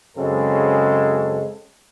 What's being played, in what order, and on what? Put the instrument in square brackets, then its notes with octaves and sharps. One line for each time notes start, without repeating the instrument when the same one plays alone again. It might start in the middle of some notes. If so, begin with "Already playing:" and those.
[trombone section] F#2 C#3 G#3 C4 A4